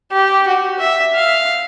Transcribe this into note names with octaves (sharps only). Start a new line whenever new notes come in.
G4
F#4
E5
F5